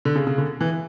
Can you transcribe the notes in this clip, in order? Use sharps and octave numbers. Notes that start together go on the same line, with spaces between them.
D3
C#3
C#3
D3
E3